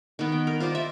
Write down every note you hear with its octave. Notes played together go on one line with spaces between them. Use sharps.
D#3 B3
G5
A#4
F4 C5 D5 D#5
E5